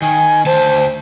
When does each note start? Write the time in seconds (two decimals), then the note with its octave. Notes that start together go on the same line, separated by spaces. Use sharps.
0.02 D#3 G#5
0.46 D2 C5 A5